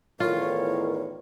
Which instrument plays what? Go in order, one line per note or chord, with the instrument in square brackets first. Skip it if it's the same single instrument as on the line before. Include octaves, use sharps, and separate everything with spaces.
[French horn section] E2 A2 D#3 [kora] F4 [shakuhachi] A#4 [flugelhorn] C#5